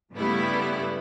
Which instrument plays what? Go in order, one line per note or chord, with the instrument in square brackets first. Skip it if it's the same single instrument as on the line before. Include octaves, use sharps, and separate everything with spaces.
[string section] G2 C#3 G3 A3 B3 E4